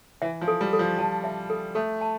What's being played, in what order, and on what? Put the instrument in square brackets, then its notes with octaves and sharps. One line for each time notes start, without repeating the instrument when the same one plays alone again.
[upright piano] E3 [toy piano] E5
[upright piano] F3
[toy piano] A4
[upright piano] G3
[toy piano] A4
[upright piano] F3
[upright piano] F3 [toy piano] A5
[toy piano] E5
A4
[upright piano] A3 [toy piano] A4
[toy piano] A5